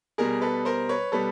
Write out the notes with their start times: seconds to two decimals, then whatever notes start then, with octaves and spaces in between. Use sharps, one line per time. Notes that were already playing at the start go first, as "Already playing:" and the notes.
0.18 B2 G3 G#4 A#4
0.42 A4 B4
0.65 A#4 C5
0.89 B4 C#5
1.12 B2 G3 A4 B4